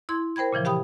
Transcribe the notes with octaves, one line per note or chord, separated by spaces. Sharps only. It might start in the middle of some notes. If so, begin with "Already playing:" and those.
E4 C6 G#6
A#4 C5 G5 B5 G#6
A#2 C#3 E3 F3
G4 F5 G5 B5 D#6